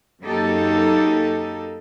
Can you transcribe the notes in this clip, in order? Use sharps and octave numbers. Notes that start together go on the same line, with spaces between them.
F#2 A#3 D#4 G4 A4